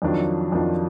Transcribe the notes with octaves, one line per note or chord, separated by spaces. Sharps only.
F2 D#3 F#3 D4 F4
F2 D#3 F#3 D4 F4